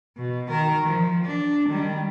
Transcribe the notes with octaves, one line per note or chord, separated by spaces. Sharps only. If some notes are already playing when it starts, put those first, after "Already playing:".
B2
D#3 A#4
F3
D4
D#3 G3